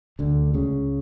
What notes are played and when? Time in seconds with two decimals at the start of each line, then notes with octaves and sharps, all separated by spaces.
0.19 D2 D3
0.54 C#2 C#3